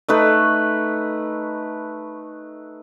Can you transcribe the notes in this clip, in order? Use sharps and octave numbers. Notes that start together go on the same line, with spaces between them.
A3 D#4 B4